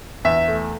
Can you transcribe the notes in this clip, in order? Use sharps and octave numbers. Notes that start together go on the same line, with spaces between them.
E2 E5
A3